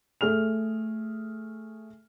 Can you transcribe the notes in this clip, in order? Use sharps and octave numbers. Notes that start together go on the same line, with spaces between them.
A3 G#4 F6 F7